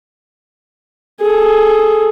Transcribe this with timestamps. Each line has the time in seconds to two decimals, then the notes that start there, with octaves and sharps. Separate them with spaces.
1.22 G#4 A4